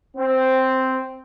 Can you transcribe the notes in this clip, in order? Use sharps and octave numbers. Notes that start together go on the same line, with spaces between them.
C4